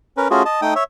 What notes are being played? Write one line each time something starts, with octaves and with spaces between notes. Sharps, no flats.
C#4 A#4 B4
A3 C#4 F4 F#4 G#4
D#5 A5
A3 D#4 G5 D#6
C#5 E5